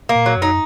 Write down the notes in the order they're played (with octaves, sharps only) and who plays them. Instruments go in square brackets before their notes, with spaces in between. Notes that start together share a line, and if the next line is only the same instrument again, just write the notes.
[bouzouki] A#3
[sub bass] A#2
[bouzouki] F#3
[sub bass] F#2 [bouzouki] D#4